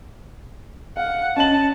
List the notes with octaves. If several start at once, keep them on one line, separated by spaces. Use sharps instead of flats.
F5 F#5
C#4 D#5 A5 F#7